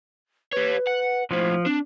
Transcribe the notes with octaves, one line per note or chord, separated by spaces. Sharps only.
G4 B4 C#5
F#5
B1 A2 F3 C5
C4 D4